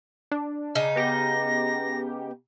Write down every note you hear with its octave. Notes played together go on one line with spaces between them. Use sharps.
D4
C#3 D#4
B3 G4 A#6